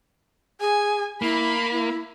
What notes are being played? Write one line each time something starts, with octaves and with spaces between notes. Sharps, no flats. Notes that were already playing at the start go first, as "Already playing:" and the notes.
G#4 G#5
A#3 E4 B5
E4